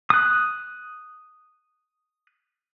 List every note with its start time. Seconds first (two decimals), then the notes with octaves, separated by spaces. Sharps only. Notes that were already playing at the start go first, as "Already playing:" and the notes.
0.10 D#6 F#6